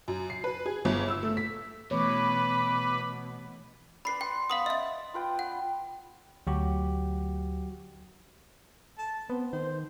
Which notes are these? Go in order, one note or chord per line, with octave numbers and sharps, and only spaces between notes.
F#2
C7
B4
G#4
G1
E6
A3
B6
B2 E3 A3 B4 C#5 B5 D6
B4 D5 B5 C7
G5 C6
B3 F5 C6 D#6
D#5 E5
F4 B4 G5
F#5
D2 F#3 F#4 G4
A5
B3 C4
D#3 C5